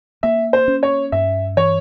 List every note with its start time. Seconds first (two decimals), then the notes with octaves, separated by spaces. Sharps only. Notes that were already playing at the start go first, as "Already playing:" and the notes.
0.23 A#3 E5
0.53 C5
0.68 C#4
0.83 C#5
1.12 G2 E5
1.57 E3 C#5